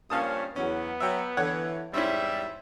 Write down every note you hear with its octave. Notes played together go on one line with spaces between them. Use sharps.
G2 F3 A#3 C#4 F5 A5 D#6
E2 F#3 B3 C#4
F#3 E5 G5
D3 E3 C#5 F#5
E2 G#2 G3 C4 C#4 E4 E5